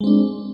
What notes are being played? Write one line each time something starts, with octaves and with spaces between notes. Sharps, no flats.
G#3 C4 D4